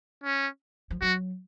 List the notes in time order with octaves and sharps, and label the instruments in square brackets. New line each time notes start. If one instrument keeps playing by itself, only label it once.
[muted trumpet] C#4
[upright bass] F3
[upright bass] F#3 [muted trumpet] F#4